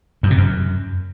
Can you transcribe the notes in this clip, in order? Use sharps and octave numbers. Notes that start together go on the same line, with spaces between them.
F#2
C3
F#2